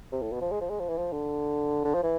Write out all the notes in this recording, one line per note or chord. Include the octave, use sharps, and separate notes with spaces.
C3
A2
B2
F3
G#3
F3
G#3
F3
E3
F3
D3
D3
F3
E3